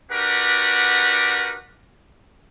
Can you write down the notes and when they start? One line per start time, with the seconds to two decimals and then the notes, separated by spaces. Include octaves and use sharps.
0.11 D4 F#4 G4 A#4 B4 F#5